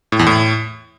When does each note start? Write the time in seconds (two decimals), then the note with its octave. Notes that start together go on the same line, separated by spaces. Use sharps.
0.12 A2
0.19 E2
0.27 A2